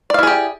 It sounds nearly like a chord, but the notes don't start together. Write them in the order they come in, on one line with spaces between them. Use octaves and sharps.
D5 F5 E4 G#4 G4